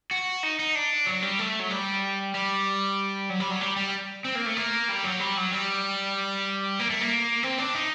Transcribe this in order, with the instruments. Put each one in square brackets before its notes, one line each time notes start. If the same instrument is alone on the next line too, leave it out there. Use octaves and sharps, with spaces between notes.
[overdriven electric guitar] F#4
D#4
D#4
D4
F#3
G3
A3
F#3
G3
G3
F#3
G3
F#3
G3
G3
C4
A#3
A3
A#3
G3
F#3
G3
F#3
G3
A#3
A3
A#3
C4
D4
D#4